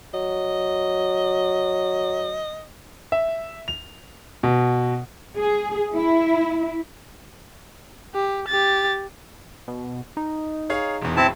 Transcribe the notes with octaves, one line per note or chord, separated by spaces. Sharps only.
F#3 D#5
E5
F7
B2
G#4
E4
G4
G4 A6
B2
D#4
G#4 C#5 F5
E1 E2
D1 C4 E4 A5